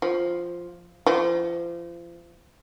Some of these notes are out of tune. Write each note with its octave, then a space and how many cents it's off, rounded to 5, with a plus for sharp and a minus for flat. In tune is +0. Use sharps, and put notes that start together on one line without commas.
F3 +0
F3 -35